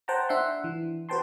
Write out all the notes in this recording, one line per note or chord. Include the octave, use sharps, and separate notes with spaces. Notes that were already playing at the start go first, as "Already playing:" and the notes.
C5 F#5 G5 A5 A#5
D4 E5 F#5 C6
E3
F#4 B4 C5 G5 A5 C6